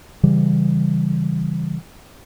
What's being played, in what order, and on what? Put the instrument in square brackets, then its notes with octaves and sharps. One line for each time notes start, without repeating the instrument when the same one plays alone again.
[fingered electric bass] C#3 E3 G3